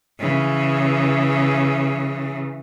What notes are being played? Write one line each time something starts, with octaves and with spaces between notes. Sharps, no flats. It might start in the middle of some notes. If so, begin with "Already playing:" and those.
C#3 E3